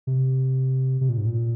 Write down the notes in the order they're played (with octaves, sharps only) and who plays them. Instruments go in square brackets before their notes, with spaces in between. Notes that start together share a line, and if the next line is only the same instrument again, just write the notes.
[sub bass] C3
C3
A#2
G#2
A#2